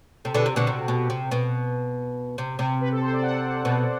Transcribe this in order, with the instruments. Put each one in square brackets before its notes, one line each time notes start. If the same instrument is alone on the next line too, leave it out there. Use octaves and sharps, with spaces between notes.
[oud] C3 [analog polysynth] A4
[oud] B2 D3 [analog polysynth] G4
[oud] C3
[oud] B2 D3 [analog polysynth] F#4
[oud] C3 [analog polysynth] F#4
[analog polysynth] F#4
[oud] B2
[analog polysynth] G4
[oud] C3
B2
C3
C3
[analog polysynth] B4
A4
C5
D5
F#5
[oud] B2